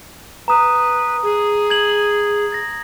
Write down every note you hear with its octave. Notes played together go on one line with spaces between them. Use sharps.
B4 A#5 D#6
G#4
G#6 F#7
A6 A#6